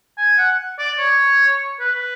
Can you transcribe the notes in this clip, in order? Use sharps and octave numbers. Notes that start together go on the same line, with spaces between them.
G#5
F#5
D5
C#5
B4